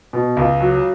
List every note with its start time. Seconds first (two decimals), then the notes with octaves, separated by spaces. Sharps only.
0.13 B2
0.37 C#2
0.60 F#3